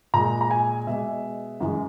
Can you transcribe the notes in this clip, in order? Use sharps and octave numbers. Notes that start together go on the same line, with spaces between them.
A#2 G#3 A#5
A#5
G#5
B2 G#3 E5
F#2 E3 G#3